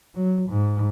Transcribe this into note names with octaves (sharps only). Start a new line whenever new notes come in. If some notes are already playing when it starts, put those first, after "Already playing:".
F#3
G#2